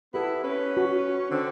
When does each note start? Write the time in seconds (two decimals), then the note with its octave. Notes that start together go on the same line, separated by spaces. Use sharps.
0.14 B3 E4 G4 A4 B4
0.44 C#4 B4
0.77 F#4
1.31 D3 C4